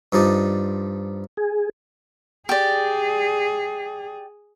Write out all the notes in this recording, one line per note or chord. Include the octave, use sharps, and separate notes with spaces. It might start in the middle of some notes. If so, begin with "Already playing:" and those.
G2 F3 D#4 D5
G#4
G4 G#4 D5